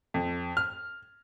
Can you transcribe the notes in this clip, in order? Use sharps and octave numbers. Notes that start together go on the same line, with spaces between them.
F2
F6